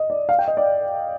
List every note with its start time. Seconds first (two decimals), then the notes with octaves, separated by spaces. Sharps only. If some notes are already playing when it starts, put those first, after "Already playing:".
Already playing: D#5
0.10 D5
0.29 F5
0.39 G5
0.48 D#5
0.57 D5